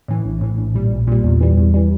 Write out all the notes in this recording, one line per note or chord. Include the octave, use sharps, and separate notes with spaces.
A2 E3
A#1
A2 E3
A#1
A#2 G3
A#1
A#2 G3
E2
E3 G3
E2
E3 G3